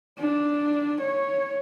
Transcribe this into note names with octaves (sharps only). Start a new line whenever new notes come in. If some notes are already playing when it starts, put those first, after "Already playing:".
D4
C#5